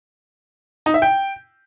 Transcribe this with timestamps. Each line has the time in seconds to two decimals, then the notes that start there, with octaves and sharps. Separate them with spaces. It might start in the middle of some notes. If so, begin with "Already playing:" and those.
0.86 D#4
0.94 E5
1.02 G5